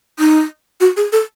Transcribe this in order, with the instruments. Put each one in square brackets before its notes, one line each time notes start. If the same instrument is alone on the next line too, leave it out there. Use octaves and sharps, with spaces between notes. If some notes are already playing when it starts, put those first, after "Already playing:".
[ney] D#4
F#4
G#4
A4